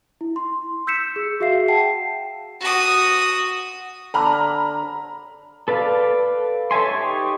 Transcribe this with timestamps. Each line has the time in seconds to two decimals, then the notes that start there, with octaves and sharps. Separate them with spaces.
0.21 E4
0.36 C6
0.87 E6 G6 B6 C#7 E7
1.16 G#4
1.40 F#4 G#4 E5 F5 C7
1.68 F#5 G5 A5 C7
2.61 F#4 D#6
4.14 D3 A#5 B5 F6
5.68 A4 B4 D5 F5
6.71 A4 C#5 E5 G#5 C6
6.91 D#4 G4 C#6